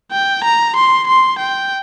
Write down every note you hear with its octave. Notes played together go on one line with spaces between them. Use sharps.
G5
A#5
C6
C6
G5